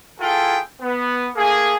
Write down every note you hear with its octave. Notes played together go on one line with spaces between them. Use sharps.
E4 F4 G#4 A4 G5
B3
A3 A#3 G#4